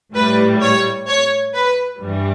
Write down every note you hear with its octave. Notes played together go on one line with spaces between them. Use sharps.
A2 G3 B4
C#5
C#5
B4
G2 E3 G3